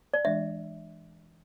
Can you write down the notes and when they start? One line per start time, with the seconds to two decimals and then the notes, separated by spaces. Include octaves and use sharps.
0.14 D5
0.25 E3 G#3 D4 E5